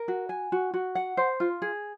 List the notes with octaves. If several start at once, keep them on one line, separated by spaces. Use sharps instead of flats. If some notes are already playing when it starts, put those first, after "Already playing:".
Already playing: A#4
F#4
G#5
F#4
F#4
F#5
C5
F4
G#4